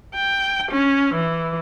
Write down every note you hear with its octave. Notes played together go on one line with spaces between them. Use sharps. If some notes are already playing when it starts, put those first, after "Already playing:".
G5
C#4
E3